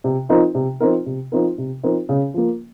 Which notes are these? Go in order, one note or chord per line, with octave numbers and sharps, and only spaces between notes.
C3
F3 C4 D#4 A#4
C3
F3 C4 D#4 A#4
C3
F3 C4 D#4 A#4
C3
F3 C4 D#4 A#4
C#3
F3 A#3